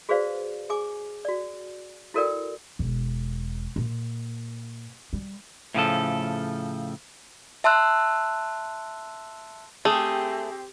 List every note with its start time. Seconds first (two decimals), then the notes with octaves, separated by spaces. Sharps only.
0.09 F#4 G#4 B4 C5 D5 F5
0.70 G#4 G#5 D6
1.25 F#4 D5
2.14 E4 F#4 A4 A#4 D5 G5
2.79 E1
3.76 A#2
5.13 G3
5.74 A2 C#3 F3 A4
7.64 E5 A5 C6 E6 F#6
9.85 A3 C4 G4 G#4